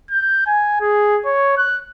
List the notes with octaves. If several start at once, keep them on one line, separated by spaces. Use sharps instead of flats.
G6
G#5
G#4
C#5
F#6